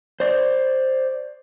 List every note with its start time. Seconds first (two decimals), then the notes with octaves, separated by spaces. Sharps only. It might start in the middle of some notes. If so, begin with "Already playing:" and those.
0.20 C5 D5